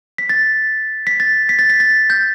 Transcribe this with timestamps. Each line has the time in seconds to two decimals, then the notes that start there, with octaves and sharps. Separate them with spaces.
0.18 B6
0.29 A6
1.07 B6
1.20 A6
1.49 B6
1.59 A6
1.70 B6
1.80 A6
2.10 G6